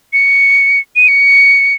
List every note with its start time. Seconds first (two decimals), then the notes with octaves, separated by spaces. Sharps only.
0.13 C#7
0.96 D#7
1.08 C#7